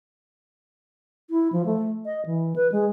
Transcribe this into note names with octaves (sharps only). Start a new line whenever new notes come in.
E4
F3
A3
D#5
E3
B4
G#3